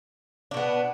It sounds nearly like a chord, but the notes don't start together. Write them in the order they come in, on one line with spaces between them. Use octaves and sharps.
D4 B2 B3